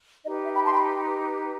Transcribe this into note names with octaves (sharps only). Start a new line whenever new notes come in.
D#4 G4 B4 D#5
E5
G5 B5
A5 C6
G5 B5